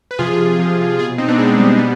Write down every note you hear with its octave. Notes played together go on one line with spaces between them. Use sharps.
B4
C3 F3 F4 G#4
C3 F3
B2 F4 G#4
C4 D#4
B3 D4
B2 G#3 C4
G3 B3
B2 G3 B3